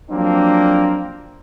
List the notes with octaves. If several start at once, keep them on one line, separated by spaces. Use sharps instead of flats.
F3 F#3 A#3 C4 D4